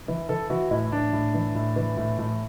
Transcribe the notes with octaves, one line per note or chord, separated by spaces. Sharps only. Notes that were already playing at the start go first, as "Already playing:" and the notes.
E3
E3 A4
E3 F#4
A2 E4
A2 D4
A2
E3
A2
E3
A2
A2